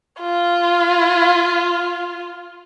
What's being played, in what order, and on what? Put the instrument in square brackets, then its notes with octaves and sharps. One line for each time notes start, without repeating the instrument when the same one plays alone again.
[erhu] F4